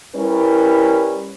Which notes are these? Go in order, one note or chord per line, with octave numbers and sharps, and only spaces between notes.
G3 C#4 E4 A#4 B4